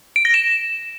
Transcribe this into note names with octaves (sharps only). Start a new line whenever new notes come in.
D7
A#6
E7